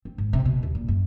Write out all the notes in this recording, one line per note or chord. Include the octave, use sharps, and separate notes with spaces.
C4
G#1
C3
B2
D#2
A#2
F#2